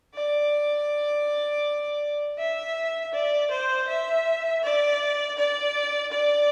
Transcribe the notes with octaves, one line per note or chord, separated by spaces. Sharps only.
D5
E5
D5
C5
E5
D5
D5
D5